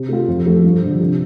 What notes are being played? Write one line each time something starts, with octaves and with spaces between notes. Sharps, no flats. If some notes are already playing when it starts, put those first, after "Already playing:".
Already playing: C3
A3 F4
F2
F3 A3
G2
D3 F3
C3